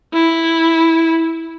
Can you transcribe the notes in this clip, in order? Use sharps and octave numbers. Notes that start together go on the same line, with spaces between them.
E4